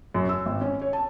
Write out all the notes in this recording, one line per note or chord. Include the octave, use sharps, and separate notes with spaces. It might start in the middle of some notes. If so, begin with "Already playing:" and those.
F#2
E6
G#1
C#4
C#5
A5